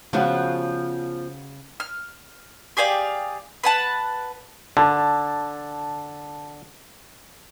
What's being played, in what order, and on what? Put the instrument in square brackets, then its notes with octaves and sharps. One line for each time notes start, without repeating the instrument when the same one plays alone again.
[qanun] C#3 F#4 [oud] F3 B3
[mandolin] F6
G4 G#4 D5 F5
B4 F#5 A5
[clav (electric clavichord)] D3 [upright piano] A5